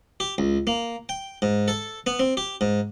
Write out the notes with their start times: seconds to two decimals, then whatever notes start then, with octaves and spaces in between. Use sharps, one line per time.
0.20 G4
0.38 C#2
0.67 A#3
1.09 G5
1.42 G#2
1.68 A4
2.07 B3
2.19 C4
2.37 G4
2.61 G#2